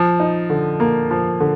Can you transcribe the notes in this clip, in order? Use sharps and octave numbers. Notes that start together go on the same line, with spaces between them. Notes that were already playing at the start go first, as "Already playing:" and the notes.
Already playing: F3
D#4
D3
A#3
F3
D3